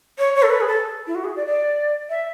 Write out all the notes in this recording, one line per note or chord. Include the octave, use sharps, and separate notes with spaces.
C#5
C#5
A4
B4
G#4
A4
E4
F#4
G#4
D5
D5
E5